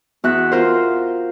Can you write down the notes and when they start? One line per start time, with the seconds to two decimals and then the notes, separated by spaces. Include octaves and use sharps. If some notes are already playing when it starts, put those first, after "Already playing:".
0.24 E2 F#4 E5 F#6
0.52 F4 A#4 C5